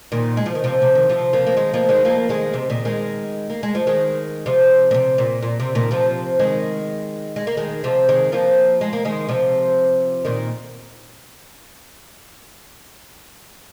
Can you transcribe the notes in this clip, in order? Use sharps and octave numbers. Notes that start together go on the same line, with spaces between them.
A#2 D#3
G#3
F3
D#3
C3 F3
C3
D#3
C3 F3
F3 A#3
A#3
D#3 G#3
F3 A#3
D#3 G#3
F3 A#3
D#3 G#3
C3
A#2 D#3
D#3 G#3
A#3
G#3
F3
D#3 G#3
C3 F3
A#2
C3
A#2
A#2
C3
A#2 D#3
C3 F3
D#3 G#3
G#3
A#3
D#3 G#3
C3 F3
D#3 G#3
F3 A#3
G#3
A#3
D#3 G#3
C3 F3
A#2 D#3